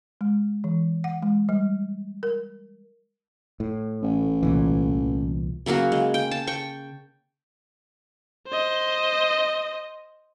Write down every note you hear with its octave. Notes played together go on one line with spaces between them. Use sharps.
G#3
E3
F#5
G#3
G3
A#4
A2
A1
C2 A#2 E3
C#3 F#3 A#3 F#4
G#3
G5
A5
G5 C#6
C5 D#5